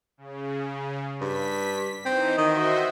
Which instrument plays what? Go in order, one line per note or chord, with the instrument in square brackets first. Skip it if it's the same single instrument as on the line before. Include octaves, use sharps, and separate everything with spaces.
[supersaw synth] C#3
[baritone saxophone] G2 [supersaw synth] B6
[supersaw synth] E3 D#4 [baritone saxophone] C4
[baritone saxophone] D#3 [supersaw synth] F#4 C5 E5 [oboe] D#5